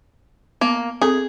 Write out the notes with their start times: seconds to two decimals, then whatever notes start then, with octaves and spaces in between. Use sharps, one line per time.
0.61 A#3 B3
1.02 C4 G#4 A4